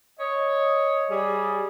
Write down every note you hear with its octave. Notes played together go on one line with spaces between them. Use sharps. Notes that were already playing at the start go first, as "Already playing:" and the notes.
C#5 D#5
G3 G#4